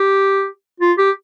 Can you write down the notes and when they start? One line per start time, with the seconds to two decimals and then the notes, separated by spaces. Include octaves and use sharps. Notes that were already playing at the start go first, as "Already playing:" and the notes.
Already playing: G4
0.80 F4
0.98 G4